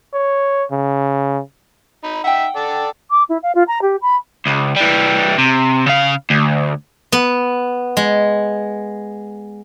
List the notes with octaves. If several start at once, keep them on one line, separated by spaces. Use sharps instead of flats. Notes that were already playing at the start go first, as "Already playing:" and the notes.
C#5
C#3
D#4 B5
D#4 E5 F#5 G5
A4 D5
D6
E4
F5
F4
A#5
G4
B5
C#2
E3 G3
C3
C#3 F5
D2
B3
G#3